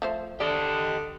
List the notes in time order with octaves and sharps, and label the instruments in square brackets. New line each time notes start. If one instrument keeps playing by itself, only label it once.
[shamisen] F3 A3 C5
[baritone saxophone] D3 [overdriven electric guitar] G4 D#5 [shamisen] D5